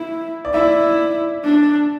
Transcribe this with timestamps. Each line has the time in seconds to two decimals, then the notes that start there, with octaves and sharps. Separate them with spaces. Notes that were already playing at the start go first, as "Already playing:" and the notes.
Already playing: E4 E5
0.45 D5
0.54 E4 E5
1.44 D4